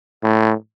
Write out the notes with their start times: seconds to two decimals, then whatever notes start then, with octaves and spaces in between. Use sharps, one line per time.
0.23 A2